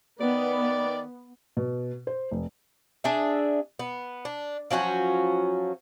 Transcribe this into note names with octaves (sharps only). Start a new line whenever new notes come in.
D#3 B3 D5
B2
C5
F1
D4 G#4 E5
B3
D4
F3 F#3 C#4 F#4